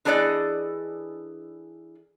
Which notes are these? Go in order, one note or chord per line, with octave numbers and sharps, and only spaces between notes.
E3 D4 G#4 A4 D5 D#5